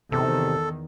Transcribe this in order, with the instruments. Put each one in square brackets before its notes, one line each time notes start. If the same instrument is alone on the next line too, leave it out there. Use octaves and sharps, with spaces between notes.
[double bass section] E2 D#3 [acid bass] C3 [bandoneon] A4